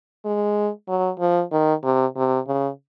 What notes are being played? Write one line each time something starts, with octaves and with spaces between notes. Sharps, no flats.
G#3
F#3
F3
D#3
C3
C3
C#3